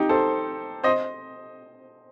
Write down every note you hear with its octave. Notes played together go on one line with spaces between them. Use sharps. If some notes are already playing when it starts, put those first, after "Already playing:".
Already playing: D#4 G4
A4 C5
C5 D#5